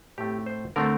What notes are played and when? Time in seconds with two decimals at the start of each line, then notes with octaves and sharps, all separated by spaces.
0.18 A2 A3 C4 G4
0.46 C5
0.76 D3 A3 C4 A#4